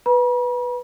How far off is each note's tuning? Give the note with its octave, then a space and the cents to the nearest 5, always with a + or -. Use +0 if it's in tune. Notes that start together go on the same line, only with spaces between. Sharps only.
B4 +0 B5 -45